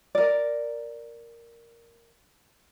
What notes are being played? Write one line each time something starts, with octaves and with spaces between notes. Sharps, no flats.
A#4 D5